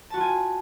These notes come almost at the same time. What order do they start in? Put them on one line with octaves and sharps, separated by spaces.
A5 F#4 F4 G#5